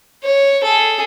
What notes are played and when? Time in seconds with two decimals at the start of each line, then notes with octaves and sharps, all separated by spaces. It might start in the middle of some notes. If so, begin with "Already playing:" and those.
0.23 C#5
0.64 G#4 A4